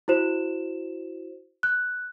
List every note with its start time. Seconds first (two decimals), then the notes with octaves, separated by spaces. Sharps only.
0.08 E4 F#4 C5 E7
1.63 F#6